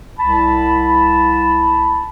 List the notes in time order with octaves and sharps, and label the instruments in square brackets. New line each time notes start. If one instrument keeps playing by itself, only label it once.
[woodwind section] C2 A5 B5